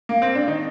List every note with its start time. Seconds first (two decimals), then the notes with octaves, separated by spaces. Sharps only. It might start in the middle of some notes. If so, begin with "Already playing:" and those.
0.09 A#3
0.22 C4
0.35 D4
0.48 D#3 D#4